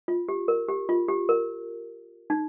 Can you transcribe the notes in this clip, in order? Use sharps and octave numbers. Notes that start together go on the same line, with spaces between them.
F4
G4
A#4
G4
F4
G4
A#4
D#4